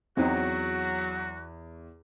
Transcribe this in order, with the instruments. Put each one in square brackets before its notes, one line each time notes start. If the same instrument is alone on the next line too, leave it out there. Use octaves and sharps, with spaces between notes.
[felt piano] E2 [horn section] F#3 [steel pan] C4 D#4 [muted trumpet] F#4